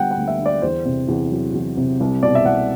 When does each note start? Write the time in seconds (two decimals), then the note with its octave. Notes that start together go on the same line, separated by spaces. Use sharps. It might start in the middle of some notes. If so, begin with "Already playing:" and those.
Already playing: D3 G3 B3 F#5 G5
0.11 F#5
0.17 D2
0.28 E5
0.39 D3
0.46 D5
0.62 E2 C5
0.85 C3
1.08 E2
1.31 F#3
1.54 E2
1.77 C3
2.00 C2
2.23 B2 D5
2.35 E5
2.45 C2 F#5